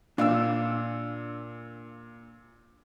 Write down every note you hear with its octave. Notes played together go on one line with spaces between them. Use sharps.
A#2 D4 D5 F5 E6